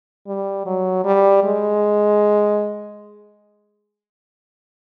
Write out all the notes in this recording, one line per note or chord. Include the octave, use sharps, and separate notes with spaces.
G3
F#3
G3
G#3